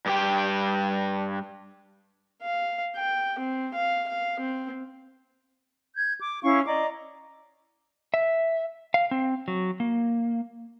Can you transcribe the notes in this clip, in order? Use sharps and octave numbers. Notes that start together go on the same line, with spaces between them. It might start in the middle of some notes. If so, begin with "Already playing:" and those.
G2 G4 G5
F5
G5
C4
F5
F5
C4
G6 G#6
D6
C#4 E4 F5 C#6
D5 D#5 A#5 D6
E5
F5
C4
F#3
A#3